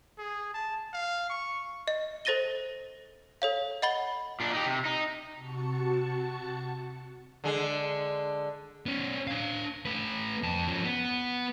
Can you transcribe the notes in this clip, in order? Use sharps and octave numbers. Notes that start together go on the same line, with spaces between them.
G#4
A5
F5
C#6
D#5
A4 C5 A6 A#6 D#7 G7
A4 C#5 F5
D#5 F#5 B5 A6 G7
A#2 D4
D#4 G4
C3
D#4
C3 F#4 A5 C#6 C#7
D3 G#3
B3 C#4
D4 F5
A3 B4
F2 A5
F3 C#4
B3